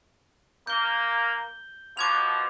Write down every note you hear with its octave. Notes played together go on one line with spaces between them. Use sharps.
A#3 G6 G7
B2 F3 D6 G#6 F7